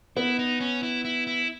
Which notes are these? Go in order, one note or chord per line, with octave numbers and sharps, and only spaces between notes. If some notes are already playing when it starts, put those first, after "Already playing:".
B3 E4
D#4
C#4
E4
E4
E4